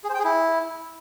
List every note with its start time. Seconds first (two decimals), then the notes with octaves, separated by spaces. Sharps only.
0.04 G#4
0.09 C5
0.14 G5
0.19 G#4
0.24 E4